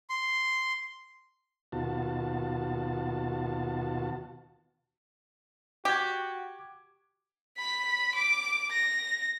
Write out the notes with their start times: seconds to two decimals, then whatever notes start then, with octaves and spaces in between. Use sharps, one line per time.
0.10 C6
1.72 D#2 B2 F4 F#4 A5
5.85 F#4 G4 D6 G#6
7.58 B5 B6
8.15 D6
8.71 A#6